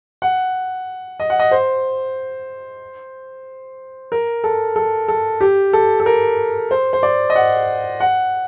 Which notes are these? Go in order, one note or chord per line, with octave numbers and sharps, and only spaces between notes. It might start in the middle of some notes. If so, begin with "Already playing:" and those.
F#5
D#5
F#5
D#5
C5
A#4
A4
A4
A4
G4
A4
A4
A#4
C5
C5
D5
D#5
F#5
F#5